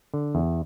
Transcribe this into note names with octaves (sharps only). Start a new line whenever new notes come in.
D3
E2